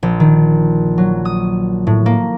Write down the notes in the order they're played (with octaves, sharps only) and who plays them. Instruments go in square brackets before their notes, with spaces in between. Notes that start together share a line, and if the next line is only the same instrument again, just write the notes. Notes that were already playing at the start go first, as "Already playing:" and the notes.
[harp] A#1
D#3
F#3
D#6
A2
A#3